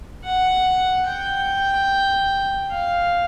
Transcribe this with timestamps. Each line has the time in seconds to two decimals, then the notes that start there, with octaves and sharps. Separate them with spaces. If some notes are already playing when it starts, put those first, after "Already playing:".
0.24 F#5
1.06 G5
2.70 F5